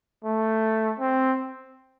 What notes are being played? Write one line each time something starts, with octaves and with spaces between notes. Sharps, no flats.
A3
C4